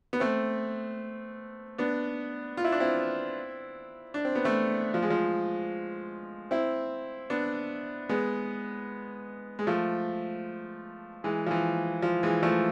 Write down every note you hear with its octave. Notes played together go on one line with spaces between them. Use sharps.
B3
A3 C4
B3 D4
F4
E4
D4
C4 E4
D4
C4
B3
A3 C4
F3
G#3
F3
C4 E4
B3 D4
G#3 B3
G#3
F3 A3
E3 G#3
F3
E3
F3
E3 G#3
F3 A3